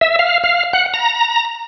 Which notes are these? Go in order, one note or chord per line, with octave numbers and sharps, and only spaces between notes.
E5
F5
F5
F#5
A#5